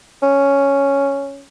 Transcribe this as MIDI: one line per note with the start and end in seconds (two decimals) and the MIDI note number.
0.22 1.45 61